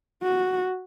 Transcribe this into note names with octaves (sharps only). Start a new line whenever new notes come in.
F#4